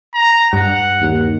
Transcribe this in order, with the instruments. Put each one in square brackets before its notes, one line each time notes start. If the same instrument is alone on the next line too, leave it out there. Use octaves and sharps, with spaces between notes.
[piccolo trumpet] A#5
[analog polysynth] G2 [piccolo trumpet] F#5
[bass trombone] D#2